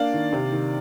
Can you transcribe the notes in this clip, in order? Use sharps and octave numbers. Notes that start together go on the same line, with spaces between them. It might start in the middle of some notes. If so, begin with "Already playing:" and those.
Already playing: A#3 D4 D5 F5
D#3
C3
D#3